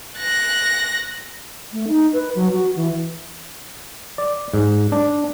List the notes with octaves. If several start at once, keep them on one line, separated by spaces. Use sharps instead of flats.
F#6 A#6
A3
D#4
B4
F#3
F#4
E3
D5
G#2
D4